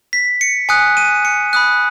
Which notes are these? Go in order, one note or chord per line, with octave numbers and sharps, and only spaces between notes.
B6
C#7
G#5 D#6 F#6 C#7
D#7
C#7
B5 D#6 F#6